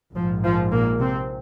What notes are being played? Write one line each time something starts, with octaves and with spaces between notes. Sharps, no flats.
A#1 G#2 F3
F3
A#2 A#3
C3 C4